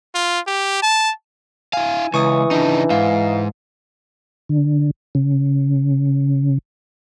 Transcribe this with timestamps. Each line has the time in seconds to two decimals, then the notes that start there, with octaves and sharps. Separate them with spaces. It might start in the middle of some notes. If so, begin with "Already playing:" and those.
0.15 F4
0.47 G4
0.82 A5
1.73 E4 F5 G#5
2.14 C#2 E3 C#6 D#6
2.51 C#3 D4 D#4
2.90 G#2 F5
4.49 D3
5.15 C#3